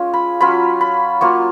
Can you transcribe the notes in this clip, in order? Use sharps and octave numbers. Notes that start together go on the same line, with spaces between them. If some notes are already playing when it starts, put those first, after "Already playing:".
Already playing: G#3 C#4 F4
B5
F#3 C#4 F4 B5
B5
F#3 A#3 F4 C#6